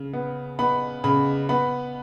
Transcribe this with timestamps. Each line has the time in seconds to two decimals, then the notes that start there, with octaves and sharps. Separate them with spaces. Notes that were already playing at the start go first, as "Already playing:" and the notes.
Already playing: C#3
0.13 B3
0.59 B3 B5
1.04 C#3 B5
1.49 B3 B5